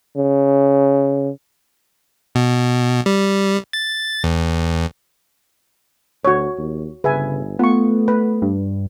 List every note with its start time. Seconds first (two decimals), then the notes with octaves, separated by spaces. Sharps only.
0.17 C#3
2.35 B2
3.06 G3
3.73 A6
4.24 E2
6.25 D2 F#4 C#5
6.58 D#2
7.04 G1 C#3 B4 E5 G#5
7.59 A3 B3 F4 C#6
8.08 B4
8.42 G2